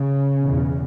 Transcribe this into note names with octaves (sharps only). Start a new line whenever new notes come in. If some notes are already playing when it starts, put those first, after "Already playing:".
Already playing: C#3
E2 B2